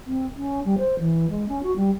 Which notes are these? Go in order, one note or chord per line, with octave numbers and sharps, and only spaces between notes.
C4
C#4
G3
C5
E3
G#3
C#4
F#4
G3